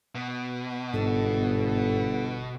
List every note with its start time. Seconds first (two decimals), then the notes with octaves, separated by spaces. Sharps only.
0.15 B2
0.93 G1 G#2 A4